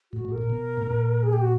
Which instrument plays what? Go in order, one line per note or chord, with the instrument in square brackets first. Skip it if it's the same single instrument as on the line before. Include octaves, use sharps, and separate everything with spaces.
[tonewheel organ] A2 [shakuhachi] F#4
[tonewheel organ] A2
[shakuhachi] A#4
[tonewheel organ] A#2
B2
A2
A#2
[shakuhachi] G#4
G4
F#4